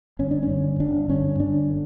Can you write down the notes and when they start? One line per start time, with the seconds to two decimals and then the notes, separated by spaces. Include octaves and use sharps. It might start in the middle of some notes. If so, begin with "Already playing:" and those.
0.19 G1 C#4
0.31 D4
0.43 C#4
0.49 G2 D3
0.80 G1 D4
1.09 G2 D3 C#4
1.39 G1 D4
1.70 D3